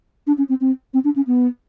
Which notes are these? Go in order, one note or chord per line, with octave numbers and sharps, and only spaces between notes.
D4
C#4
C4
C4
C4
D4
C#4
B3